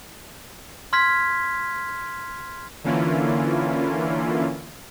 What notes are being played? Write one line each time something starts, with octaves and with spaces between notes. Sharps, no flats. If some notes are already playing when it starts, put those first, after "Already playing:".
C6 F6 G#6 B6
D3 E3 A#3 C#4 E4 F4